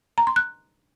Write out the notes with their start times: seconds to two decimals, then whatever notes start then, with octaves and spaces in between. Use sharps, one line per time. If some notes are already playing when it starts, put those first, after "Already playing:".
0.18 A#5
0.27 C6
0.36 F#6